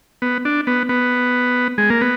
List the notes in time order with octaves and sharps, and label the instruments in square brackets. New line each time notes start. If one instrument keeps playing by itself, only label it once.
[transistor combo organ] B3
D4
B3
B3
G#3
A#3
B3